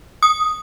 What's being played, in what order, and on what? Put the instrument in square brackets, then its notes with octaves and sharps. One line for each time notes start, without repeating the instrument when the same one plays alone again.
[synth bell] D#6